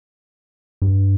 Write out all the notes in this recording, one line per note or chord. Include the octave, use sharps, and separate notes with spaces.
G2